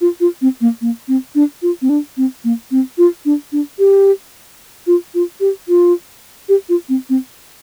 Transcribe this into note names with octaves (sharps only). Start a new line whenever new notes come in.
F4
F4
C4
A#3
A#3
C4
D4
F4
C4
D4
C4
A#3
C4
F4
D4
D4
G4
F4
F4
G4
F4
G4
F4
C4
C4